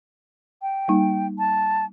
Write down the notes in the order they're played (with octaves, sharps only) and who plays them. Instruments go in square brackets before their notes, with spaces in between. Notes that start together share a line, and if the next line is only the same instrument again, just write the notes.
[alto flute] G5
[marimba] G3 A#3 D#4
[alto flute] A5